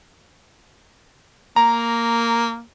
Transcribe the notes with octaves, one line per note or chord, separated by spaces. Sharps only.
A#3 A#5